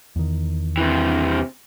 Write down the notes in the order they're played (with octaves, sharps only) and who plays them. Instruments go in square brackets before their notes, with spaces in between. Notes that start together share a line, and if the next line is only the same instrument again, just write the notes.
[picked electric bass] E2 D#3
[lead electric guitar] C3 E3